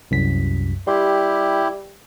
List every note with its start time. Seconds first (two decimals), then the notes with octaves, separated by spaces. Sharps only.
0.11 C2 F#2 B6
0.87 G3 E4 G4 C6